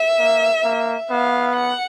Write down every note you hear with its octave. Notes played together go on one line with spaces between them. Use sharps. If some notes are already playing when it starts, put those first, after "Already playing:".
Already playing: E5
A#3
A#3
B3 F5
F#5